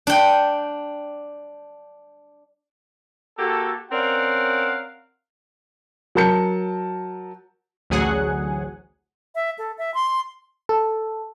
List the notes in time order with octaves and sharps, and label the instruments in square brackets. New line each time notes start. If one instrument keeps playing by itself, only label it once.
[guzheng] D4 G5
[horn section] A#3 F#4 G4 A4
C4 C#4 A#4 D5 F5 F#5
[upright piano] F#3 A#4 A5 G6 C#7
[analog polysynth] A1 D2 F#3 G#4 F#5 G#5
[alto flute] E5
A4
E5
C6
[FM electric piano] A4